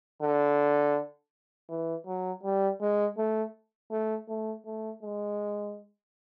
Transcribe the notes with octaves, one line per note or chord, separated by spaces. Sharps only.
D3
E3
F#3
G3
G#3
A3
A3
A3
A3
G#3